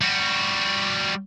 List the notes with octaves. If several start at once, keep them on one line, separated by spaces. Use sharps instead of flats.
G3 F#4